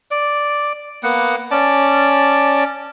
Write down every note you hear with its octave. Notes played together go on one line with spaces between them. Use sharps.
D5
A#3 B3 F#5
C#4 D5 A5